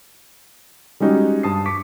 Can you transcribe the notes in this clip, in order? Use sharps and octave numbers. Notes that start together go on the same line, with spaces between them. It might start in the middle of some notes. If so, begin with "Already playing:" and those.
G3 G#3 C#4 D#4 F#4 G4
G2 A5 D#6 C7
C#6 D6 B6